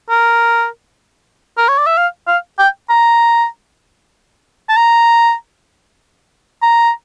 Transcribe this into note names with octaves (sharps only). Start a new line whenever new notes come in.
A#4
A#4
C#5
D5
E5
F5
F5
G5
A#5
A5
A#5
A#5